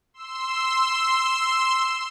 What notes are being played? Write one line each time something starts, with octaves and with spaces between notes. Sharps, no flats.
C6 E6